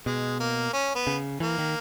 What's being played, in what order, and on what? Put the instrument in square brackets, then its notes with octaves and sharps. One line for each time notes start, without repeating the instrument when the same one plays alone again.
[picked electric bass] B2 [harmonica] G#3
[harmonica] A#3
C#4
B3
[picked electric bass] C#3
[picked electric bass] E3 [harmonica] A#3
[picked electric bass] D#3